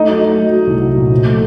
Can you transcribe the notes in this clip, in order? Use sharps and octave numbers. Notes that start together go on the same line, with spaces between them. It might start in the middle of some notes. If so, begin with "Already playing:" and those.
Already playing: A3 D#4 D#5
F#3
F#3
A3
F#3
C2
F#3
A#2
F3
A3